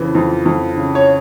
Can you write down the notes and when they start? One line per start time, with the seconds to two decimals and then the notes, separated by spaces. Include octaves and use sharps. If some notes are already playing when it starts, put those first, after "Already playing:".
Already playing: F2 C#3 E3
0.15 F2
0.46 F2
0.76 C#3
0.95 C#5